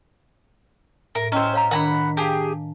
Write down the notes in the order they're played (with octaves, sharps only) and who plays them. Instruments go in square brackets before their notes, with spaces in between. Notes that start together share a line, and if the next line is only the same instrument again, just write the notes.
[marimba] A2 [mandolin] A#4 [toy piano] E5
[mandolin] C#4 C5 [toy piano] E4 [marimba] D#5 G5 E6
[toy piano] C#5 F5 A#5
[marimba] D#3 D4 [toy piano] A#4 D5 [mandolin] F#5 A#5 B5
[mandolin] G4 G#4 [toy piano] F5 G#5 A5